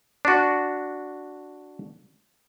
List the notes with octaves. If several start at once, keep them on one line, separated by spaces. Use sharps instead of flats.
D4 F#4